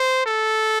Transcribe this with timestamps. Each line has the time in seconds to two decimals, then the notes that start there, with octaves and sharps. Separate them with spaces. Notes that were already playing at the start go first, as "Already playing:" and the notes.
Already playing: C5
0.26 A4